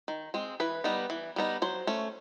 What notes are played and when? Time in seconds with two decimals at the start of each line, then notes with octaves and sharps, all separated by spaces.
0.08 D#3
0.34 G#3 C4
0.60 E3 B4
0.84 G3 B3 D#4
1.10 E3
1.36 G3 B3 D#4
1.62 F#3 C5
1.87 A3 C#4